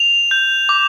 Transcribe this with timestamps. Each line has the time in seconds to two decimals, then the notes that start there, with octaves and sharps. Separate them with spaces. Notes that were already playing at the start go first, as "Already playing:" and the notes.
Already playing: F7
0.31 G6
0.69 D6